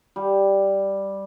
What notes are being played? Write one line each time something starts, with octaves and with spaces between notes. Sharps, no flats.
G3